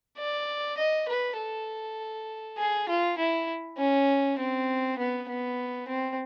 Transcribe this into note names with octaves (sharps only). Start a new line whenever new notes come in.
D5
D#5
B4
A4
G#4
F4
E4
C#4
C4
B3
B3
C4